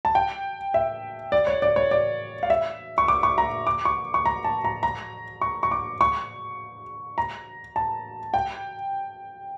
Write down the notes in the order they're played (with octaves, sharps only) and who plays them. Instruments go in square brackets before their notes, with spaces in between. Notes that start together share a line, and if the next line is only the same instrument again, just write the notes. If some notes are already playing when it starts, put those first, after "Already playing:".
[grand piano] A5
G5
E5
D5
C#5
D5
C#5
D5
F5
E5
C#6
D6
C#6
A#5
D6
C#6
C#6
A#5
A5
A#5
A#5
C#6
C#6
D6
C#6
A#5
A5
G5